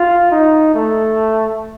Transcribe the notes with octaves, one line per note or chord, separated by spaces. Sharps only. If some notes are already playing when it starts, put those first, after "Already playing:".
Already playing: F4
D#4
A3